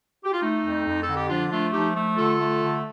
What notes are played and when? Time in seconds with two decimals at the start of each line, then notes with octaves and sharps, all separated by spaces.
0.24 G4
0.33 F4
0.42 A3 D#4
0.64 F2
0.86 F2
1.03 D3 A4
1.16 G4
1.29 F3 D4 F4
1.51 A3 D4 F4
1.73 F3 D#4 G4
1.95 A3
2.17 D3 F4 A4
2.38 A3
2.61 D3